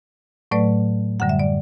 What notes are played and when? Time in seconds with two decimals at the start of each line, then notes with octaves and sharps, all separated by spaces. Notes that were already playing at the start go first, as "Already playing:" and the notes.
0.51 A2 F#3 A3 B4 D5
1.20 F#2 D3 G3 F#5
1.29 E5
1.39 D5